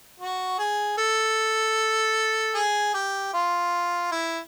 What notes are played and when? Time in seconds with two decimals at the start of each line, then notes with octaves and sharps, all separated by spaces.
0.20 F#4
0.58 G#4
0.97 A4
2.55 G#4
2.94 G4
3.33 F4
4.11 E4